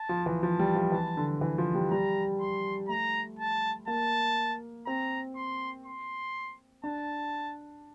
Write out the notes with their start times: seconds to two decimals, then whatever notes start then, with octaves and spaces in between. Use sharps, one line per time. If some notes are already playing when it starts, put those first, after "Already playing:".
Already playing: A5
0.09 F3
0.26 E3
0.43 F3 A5
0.59 G3
0.75 F3
0.91 E3 A5
1.17 D3
1.41 E3
1.58 F3
1.74 G3
1.91 G3 A#5
2.40 C6
2.89 A3 A#5
3.39 A5
3.87 A#3 A5
4.86 C4 A#5
5.36 C6
5.86 C6
6.84 D4 A5